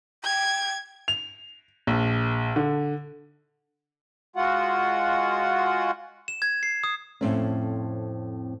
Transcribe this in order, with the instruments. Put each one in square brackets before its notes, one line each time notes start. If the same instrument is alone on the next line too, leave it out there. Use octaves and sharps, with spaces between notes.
[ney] G5 [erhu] G#6
[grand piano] F7
A#1
D3
[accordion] G#3 F4 F#4 F#5
[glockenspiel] E7
G#6
C7
D#6
[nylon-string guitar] F2 A2 C4 C#4